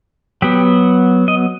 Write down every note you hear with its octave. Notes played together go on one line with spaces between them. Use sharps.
F#3 B3 G4
D#5